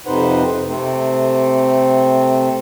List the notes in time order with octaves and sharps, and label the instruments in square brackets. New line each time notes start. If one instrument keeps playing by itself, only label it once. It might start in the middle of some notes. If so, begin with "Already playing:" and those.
[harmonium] F2 C3 D#4 B4 C5 F#5
C3 A3 C4